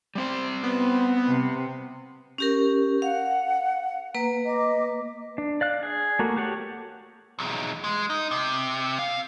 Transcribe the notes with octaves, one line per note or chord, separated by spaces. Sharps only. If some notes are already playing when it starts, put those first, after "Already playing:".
G3 C4 C5
B3
C3
C#4 G4 A#4
F5 F#5
A#3 B4 A#5
D#5 D6
D4
D5 F5 F#6
G#4
A3 A#3 F#4
F#4 G4 A4 C#5 F#5
B1 E2
G#3
D#4
C3
F5